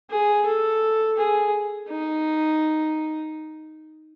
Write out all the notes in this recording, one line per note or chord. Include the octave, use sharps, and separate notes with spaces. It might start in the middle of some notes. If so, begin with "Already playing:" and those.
G#4
A4
G#4
D#4